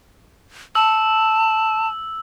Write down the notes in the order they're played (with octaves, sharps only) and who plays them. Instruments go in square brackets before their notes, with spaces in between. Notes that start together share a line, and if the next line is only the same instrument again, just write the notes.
[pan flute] A5 [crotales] E6